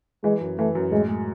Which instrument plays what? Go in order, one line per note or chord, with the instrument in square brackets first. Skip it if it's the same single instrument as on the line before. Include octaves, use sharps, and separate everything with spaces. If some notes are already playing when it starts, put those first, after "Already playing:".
[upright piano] E3 [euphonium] G#3
[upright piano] F#2
[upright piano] E3 [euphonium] A3
[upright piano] F#2
[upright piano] A2 [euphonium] G#3
[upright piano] G#3